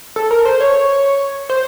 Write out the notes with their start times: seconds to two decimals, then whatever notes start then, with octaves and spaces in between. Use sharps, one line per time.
0.16 A4
0.31 A#4
0.45 C5
0.60 C#5
1.50 C5